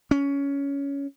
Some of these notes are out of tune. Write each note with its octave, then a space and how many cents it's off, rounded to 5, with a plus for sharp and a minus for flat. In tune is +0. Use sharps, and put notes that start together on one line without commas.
C#4 +15